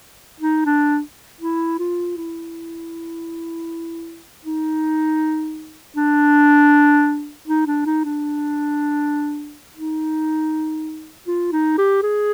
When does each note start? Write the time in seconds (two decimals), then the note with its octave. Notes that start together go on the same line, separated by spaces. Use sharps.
0.40 D#4
0.66 D4
1.41 E4
1.79 F4
2.17 E4
4.45 D#4
5.97 D4
7.48 D#4
7.67 D4
7.86 D#4
8.05 D4
9.76 D#4
11.27 F4
11.53 D#4
11.78 G4
12.03 G#4